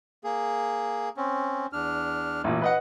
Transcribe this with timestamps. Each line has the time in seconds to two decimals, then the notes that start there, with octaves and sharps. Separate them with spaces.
0.24 A#3 G#4
1.17 C4 C#4
1.73 E2 D4 F6
2.44 A1 A#2
2.62 B4 D#5 F#5